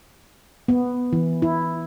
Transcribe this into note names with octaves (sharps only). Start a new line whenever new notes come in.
B3
E3
E4